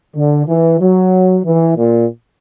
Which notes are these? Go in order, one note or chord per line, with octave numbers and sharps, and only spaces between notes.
D3
E3
F#3
E3
A#2